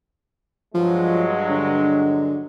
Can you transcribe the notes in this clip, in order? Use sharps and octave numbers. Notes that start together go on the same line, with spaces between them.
G2 F3 F#3 G#3
D3